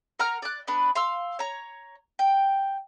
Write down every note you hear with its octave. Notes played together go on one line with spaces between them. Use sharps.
A#4 F#5 A#5 F6
D5 F#6
B3 D4 B4
F5 C6 E6
C#5 A#5
G5